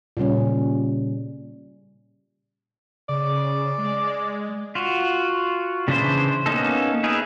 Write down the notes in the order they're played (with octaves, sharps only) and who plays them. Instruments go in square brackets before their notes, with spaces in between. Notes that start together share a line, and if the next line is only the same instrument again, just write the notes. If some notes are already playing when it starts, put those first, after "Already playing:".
[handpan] A#2 C#3 G3 C#4
[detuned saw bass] C#3 [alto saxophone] D5
[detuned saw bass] G#3
[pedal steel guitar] F4 F#4
C#3 E3 D4 E4 C5
A#3 B3 C#4 D#4 A4
D#4 G#4 A#4 B4 E5